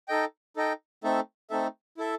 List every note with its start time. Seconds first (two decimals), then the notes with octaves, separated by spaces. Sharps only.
0.08 D#4 A4 D#5 G5
0.57 D#4 A4 D#5 G5
1.04 A3 C4 D#4 A4 E5
1.50 A3 C4 D#4 A4 E5
1.97 E4 A4 E5